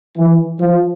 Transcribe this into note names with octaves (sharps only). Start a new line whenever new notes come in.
E3
F3